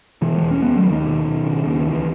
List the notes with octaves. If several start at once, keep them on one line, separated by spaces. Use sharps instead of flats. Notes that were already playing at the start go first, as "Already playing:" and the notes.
B2 E3 G#3
E3 G#3
E2
C#4
D#2 G#3 B3
F#3 A3
D#2
D#3
B2
B2
C#3
D#2
C#2 E3